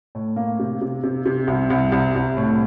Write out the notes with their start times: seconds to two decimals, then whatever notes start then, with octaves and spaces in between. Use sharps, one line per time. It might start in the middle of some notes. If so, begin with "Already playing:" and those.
0.15 A2
0.36 A#3
0.59 C3
0.81 C3
1.03 C3
1.26 C3
1.47 C2
1.70 C2
1.92 C2
2.15 C2
2.37 A2